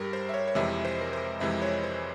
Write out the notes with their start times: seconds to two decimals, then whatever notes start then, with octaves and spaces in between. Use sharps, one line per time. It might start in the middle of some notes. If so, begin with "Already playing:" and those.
Already playing: G2 G3 G4 G#4 A#4
0.13 C5
0.29 E5
0.34 C#5
0.47 C#5
0.55 F2 C3 E3 G#3 E5
0.85 C5
1.01 A#4
1.13 C5
1.40 F2 C3 E3 G#3 E5
1.62 C#5
1.84 C5